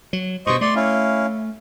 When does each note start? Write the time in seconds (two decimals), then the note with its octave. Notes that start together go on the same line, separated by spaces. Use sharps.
0.13 F#3
0.47 G2 B2 C5 D#5 C#6
0.61 A3 D5 C6
0.76 C#4 E4 F5